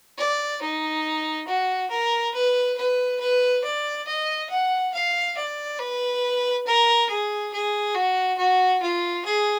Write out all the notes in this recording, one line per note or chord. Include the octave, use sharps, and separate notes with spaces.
D5
D#4
F#4
A#4
B4
B4
B4
D5
D#5
F#5
F5
D5
B4
A#4
G#4
G#4
F#4
F#4
F4
G#4